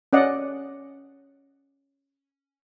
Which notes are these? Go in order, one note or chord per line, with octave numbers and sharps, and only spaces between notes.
C#4 D5 D#5 F#5